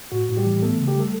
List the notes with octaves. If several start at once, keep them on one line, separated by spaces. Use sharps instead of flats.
A2 F#4
A2
G3 G4
E3
A3 B3 A4
C#3
G4
G3
A4